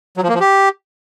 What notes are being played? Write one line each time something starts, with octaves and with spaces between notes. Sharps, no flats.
F#3
F3
A#3
F3
G4